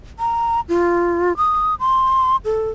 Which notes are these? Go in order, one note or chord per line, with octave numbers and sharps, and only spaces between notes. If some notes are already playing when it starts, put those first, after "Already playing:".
A#5
F4
D#6
C6
A4